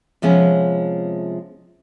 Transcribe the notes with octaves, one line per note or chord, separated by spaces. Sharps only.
C3 F3 G#3 B3 C#4